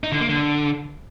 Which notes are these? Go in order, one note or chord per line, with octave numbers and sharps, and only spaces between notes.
D#4
D3
A#3
D3